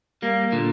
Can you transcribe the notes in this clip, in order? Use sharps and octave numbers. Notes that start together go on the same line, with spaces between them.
G3 A#3
A#2 D3